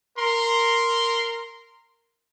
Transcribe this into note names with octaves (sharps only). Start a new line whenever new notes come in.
A#4 C6